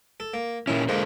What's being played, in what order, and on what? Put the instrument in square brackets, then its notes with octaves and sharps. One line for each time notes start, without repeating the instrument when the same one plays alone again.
[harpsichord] A4
A#3
[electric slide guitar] A#2 C#4 [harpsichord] D#3 E4
[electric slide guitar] D3 A4 C5 [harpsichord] G#3 A#3